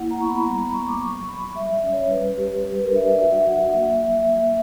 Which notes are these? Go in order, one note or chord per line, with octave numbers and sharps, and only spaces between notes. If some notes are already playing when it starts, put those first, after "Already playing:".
Already playing: A#3 E4 F#5
A#5
B3 C#6
B5
G3 A#5
B5
A#3 C#6
D6
F#3 C#6
F#3 B5
G3 E5
D5
C#4
C#5
G3 B4
G3 G4
G3 G4
B4
A#4
D4 E5
D5
F#4 E5
F#5
F#3 E5
F#5
A#3 E5
F#3
E5
A#3